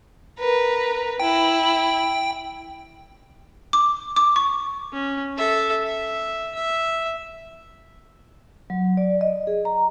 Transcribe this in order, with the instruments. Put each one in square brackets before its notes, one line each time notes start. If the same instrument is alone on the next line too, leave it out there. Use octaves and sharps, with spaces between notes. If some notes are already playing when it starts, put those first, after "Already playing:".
[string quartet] A#4 B4
[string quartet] E4 [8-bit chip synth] G5
[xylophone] D6
D6
C#6
[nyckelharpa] C#4
A4 E5
E5
E5
[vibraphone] F#3
D5
D#5
G#4
A#5